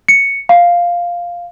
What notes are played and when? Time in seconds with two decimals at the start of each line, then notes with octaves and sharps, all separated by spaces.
0.09 C#7
0.49 F5